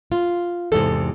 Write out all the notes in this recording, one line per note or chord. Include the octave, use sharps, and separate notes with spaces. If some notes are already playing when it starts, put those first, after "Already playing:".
F4
E2 G#2 C3 A4